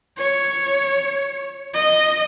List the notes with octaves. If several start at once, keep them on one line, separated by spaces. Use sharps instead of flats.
C#5
D#5